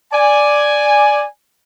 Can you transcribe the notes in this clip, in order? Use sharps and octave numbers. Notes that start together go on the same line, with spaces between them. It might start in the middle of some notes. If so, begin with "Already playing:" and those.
D5 G#5